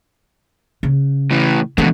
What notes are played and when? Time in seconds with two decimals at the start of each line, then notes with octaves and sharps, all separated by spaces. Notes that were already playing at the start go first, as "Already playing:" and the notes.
0.83 C#3
1.31 A2 E3
1.78 B2 D3 E3 G#3